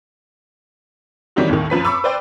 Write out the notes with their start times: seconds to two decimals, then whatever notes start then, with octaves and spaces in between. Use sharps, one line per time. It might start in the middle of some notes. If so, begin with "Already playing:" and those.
1.36 D#3 E3 G3 C#4 D#4 F#4
1.49 D#2 A2 D#3
1.70 F#2 F3 B4 B6
1.85 B5 C#6 D6 E6
2.04 B4 C5 D5 G5